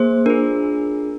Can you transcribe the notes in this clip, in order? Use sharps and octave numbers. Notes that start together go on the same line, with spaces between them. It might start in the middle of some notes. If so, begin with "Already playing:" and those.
Already playing: A#3 G#4 C5
D4 F4 G#4 A#4